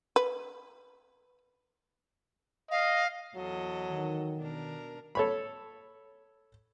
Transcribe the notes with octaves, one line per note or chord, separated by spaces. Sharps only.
B4
D#5 F5
E2 F#3 A4 D#5
D#3
B2 D4 A#4
A4 C#5 B5